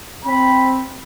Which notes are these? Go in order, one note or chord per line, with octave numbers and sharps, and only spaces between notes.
C4 B5